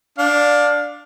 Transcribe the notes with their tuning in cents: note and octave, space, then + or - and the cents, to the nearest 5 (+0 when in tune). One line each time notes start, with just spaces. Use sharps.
D4 +0 F5 +25